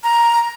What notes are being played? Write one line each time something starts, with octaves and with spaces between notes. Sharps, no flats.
A#5